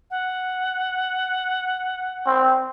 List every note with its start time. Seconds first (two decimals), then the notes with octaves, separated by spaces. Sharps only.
0.11 F#5
2.27 C4